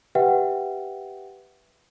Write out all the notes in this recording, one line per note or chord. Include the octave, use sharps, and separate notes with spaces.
G4 B4 E5 F#5 G5